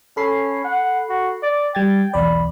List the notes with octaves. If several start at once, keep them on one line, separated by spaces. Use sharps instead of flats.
C#4 A4 B5 C7
F#5
F#4
D5
G3 G5 G#6 A6
B1 E2 D5 B5